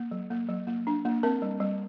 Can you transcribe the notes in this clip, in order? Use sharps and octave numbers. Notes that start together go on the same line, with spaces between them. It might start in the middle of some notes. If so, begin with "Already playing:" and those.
Already playing: A#3
F#3
A#3
F#3
A#3
D4
A#3
C4 A#4
G3
G3